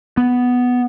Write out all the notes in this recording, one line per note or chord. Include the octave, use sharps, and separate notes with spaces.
B3